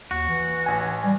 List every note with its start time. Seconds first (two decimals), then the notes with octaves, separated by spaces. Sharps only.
0.11 D#2 F#4
0.29 E3
0.66 A1 G#5
1.05 G3